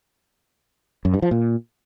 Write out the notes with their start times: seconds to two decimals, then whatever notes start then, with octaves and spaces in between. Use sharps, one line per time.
1.05 F#2
1.14 G2
1.22 F3
1.31 A#2